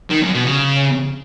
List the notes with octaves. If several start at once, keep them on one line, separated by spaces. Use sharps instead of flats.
D#3
F#2
B2
C#3